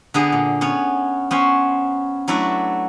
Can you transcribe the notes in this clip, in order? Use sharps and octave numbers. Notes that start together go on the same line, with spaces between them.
D3 B3 G#4
A#2
B3 C#4 C#5
B3 C#4 C5
F#3 A3 D4 E4 A4 B4